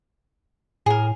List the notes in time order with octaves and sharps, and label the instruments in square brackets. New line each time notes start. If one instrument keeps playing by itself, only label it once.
[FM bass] A2 [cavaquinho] G#4 A#4